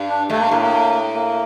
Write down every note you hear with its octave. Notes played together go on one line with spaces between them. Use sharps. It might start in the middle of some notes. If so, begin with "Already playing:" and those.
Already playing: G2
D4
G2 A3
A#3
A2 A#3
A#3
A#3